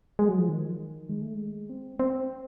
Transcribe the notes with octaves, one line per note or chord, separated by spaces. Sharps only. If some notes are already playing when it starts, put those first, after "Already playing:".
G#3
F#3
F3
D#3
G#3
A3
G#3
C4
C4